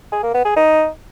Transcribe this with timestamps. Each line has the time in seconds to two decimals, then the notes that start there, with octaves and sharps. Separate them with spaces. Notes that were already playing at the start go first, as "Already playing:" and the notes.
0.12 G#4
0.23 A#3
0.34 B3
0.45 G#4
0.56 D#4